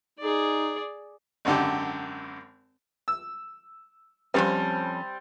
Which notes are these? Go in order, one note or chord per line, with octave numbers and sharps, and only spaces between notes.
D#4 G#4 D5
G#1 F#2 D3 G4
E6
F2 A#2 G3 C4 C#4